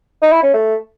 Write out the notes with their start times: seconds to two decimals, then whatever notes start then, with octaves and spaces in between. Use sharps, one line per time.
0.22 D#4
0.32 E4
0.43 C#4
0.54 A3